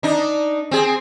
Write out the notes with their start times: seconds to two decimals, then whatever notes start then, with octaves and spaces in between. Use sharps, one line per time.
0.03 D4 D#4
0.71 C4 G#4